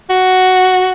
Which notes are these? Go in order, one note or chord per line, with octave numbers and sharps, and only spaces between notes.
F#4